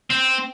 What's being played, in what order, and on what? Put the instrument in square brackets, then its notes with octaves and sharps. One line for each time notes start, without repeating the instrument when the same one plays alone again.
[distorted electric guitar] C4